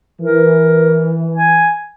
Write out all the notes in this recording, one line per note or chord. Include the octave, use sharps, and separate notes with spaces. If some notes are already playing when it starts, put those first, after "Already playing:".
E3 A#4
G#5